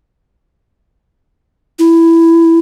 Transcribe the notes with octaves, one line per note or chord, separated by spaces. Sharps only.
E4